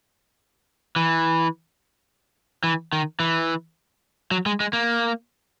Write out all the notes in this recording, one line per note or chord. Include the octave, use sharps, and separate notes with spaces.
E3
E3
D#3
E3
F#3
G#3
G#3
A#3